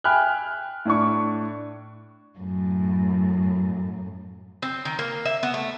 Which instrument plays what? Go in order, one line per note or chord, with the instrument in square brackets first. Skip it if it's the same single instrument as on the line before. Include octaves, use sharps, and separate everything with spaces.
[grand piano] E5 G5 G#5 B5 F6 F#6
A2 D4 C#6
[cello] F#2 A2
[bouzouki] C4
D#3
A#3
E5
B3
A3